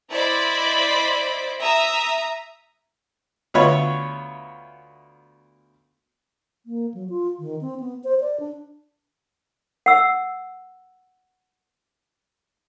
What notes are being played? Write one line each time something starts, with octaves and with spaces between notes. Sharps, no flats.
E4 C5 D5 D#5 B5
E5 A#5 D#6
D2 B3 F4 C#5 E5 B5
A#3
F#3
F4
D#3
C4
B3
C5
D5
D4
F#5 E6